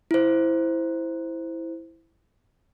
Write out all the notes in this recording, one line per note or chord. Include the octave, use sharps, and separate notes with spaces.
E4 C5